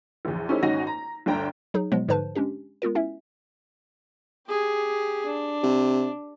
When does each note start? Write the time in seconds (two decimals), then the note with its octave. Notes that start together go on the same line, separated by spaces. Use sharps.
0.25 A#1 E2
0.49 C#4 D#4 E4 G4 A4 C5
0.63 G#1 C#4 D#4 F#4 A#6
0.87 A#5
1.26 G1 D2 D4 G5 A#5
1.74 F#3 D#4 G#4
1.92 B2 F3 F#3 G#3 B3
2.08 G#2 D3 F3 B4 C5 A5
2.35 G#3 C#4 D4 G4
2.82 G#3 B3 F4 A#4
2.95 C#4 E4 E5
4.47 G4 G#4
5.25 D4
5.63 C3